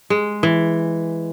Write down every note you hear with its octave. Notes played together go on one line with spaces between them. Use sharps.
G#3
E3